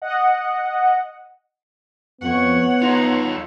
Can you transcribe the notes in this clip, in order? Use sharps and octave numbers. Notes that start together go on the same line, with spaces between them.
D#5 F#5
F2 B3 C#5 F#5 C#6
D#4 F4 D#5 C6